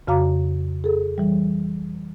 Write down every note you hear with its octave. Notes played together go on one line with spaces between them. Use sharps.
F2 C#3 F#4 F5 A#5 D6
G#4 A4
E3 G3